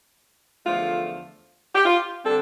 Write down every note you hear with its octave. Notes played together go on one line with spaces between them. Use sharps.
E2 D3 F3 A3 F4
G4
F4
D3 G3 C4 A4